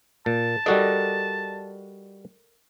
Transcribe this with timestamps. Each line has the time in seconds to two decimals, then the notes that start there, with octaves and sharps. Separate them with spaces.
0.26 A#2 A5
0.66 G3 F#4 A4 A#4 D5 D#5